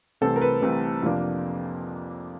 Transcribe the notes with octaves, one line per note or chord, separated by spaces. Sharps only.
C2 C3 E3 A3 C4 A4
A#4
B4
C2 C3 E3 A3 C4
F2 C3 F3 A#3 D4